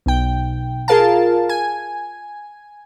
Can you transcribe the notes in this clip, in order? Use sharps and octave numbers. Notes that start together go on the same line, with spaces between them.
B1 G5
F4 G#4 A#4 F5 A5
G#5